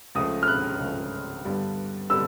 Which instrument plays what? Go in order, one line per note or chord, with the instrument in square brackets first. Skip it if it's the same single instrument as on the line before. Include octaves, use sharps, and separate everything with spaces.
[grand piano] C#2 C#3 F3 A3 [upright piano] D#6
[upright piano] F6
F#6
[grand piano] C#2 C#3 F3 A3
G2 D3 G3 B3
[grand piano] D3 G3 B3 [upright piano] E6